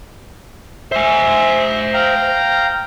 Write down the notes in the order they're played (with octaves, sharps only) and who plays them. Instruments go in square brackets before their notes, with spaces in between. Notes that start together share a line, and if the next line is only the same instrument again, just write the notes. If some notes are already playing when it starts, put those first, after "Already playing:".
[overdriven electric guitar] C5 G#5 [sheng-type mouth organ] E5
[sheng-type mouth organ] F5 G5 A#5